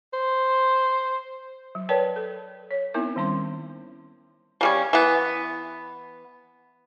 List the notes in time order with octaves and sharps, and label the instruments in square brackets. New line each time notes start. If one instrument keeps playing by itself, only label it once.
[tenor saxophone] C5
[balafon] F#3
A#4 B4 C#5 D5 G5 A5
A4
C#5
B3 C4 D#4 E4 A#4 E5
D#3 G3 C#4 C6
[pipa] C#3 G3 C#4
E3 B3